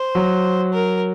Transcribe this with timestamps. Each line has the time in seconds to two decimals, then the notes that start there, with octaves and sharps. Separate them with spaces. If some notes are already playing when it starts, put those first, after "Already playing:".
Already playing: C5
0.15 F#3
0.73 A#4